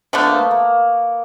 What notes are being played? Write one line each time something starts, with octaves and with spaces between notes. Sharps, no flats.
D3 F3 A3 B3
A#3
A3
A#3